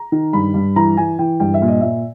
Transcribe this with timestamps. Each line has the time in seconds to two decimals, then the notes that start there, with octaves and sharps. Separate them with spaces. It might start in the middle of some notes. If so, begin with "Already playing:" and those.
Already playing: A#5
0.12 D#3
0.33 G2 B5
0.54 G2
0.76 E3 A#5
0.97 E3 G#5
1.19 E3 G5
1.40 G2 G5
1.54 E5
1.62 A#2
1.68 D#5
1.81 A#2 E5